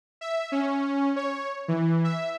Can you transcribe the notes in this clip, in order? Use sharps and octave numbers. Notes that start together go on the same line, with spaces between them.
E5
C#4
C#5
E3
E5